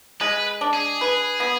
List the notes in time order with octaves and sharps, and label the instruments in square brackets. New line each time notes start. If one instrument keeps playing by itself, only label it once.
[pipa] G#3 [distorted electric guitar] B4
[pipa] D4
[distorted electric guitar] G#4
[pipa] B4
B3